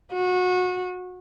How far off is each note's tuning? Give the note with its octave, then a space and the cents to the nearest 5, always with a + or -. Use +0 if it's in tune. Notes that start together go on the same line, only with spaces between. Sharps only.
F#4 -25